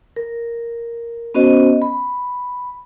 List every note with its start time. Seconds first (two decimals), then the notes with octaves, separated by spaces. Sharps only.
0.16 A#4
1.34 B3 C#4 F#4 C5 D#5
1.82 B5